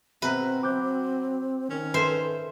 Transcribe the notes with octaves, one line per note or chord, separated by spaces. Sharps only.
B2 C4 B4 E5 A#5
F#3 D6 F#6 G6
D#3 C#4
A4 B4 C5 E5 C6